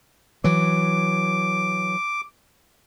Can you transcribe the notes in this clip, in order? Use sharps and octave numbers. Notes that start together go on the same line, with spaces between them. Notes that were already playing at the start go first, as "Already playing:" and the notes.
E3 F#3 D6